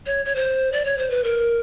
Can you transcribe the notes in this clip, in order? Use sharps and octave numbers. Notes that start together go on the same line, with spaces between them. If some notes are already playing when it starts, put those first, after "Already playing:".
C#5
C#5
C5
D5
C#5
C5
B4
A#4